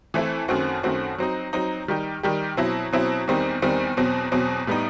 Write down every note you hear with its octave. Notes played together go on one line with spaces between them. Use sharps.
E3 A3 C4 E4
F#2 D#3 A3 C4 F#4
F#2 D#3 A3 C4 F#4
F#3 C4 D#4
F#3 C4 D#4
D#3 G3 D#4 G4
D#3 G3 D#4 G4
B2 F#3 C4 E4
B2 F#3 C4 E4
E2 D#3 G3 C4 D#4
E2 D#3 G3 C4 D#4
E2 B2 F#3 C4
E2 B2 F#3 C4
A2 G3 B3 D#4